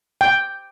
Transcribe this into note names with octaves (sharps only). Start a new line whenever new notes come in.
G5